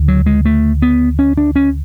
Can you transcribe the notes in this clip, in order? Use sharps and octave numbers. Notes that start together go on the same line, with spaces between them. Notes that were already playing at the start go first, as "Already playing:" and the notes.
Already playing: D2 C#3
F#3
G#3
A3
B3
C#4
D4
C#4